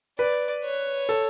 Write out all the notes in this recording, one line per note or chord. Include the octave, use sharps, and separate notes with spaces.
B4 D5
C#5
A4